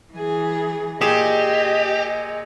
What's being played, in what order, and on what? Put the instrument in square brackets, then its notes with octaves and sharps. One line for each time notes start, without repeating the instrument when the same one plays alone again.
[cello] E3 G#4
[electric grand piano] A#2 G#4 E7 [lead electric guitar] G4 [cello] D#5